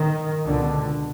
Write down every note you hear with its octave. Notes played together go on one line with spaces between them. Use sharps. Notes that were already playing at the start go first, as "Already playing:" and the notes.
Already playing: D#3
C#2 B2 D3